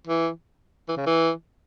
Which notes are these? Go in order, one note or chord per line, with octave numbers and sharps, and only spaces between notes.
E3
E3
C#3
E3